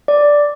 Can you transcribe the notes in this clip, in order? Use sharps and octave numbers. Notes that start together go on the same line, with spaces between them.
D5